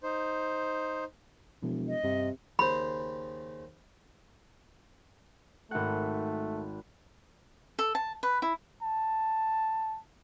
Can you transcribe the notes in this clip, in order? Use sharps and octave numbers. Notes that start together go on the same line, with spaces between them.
D#4 C5
E1 B2 F3
D#5
G1 G2 C3
D#2 C#3 C5 B5
G#1 A3 F#5
A4
A5
B4
E4
A5